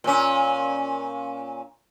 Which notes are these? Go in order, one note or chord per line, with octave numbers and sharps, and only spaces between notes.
A#2 C#4